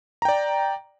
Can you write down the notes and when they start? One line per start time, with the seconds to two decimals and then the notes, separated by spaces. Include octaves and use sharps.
0.22 A#5
0.25 G5
0.29 D5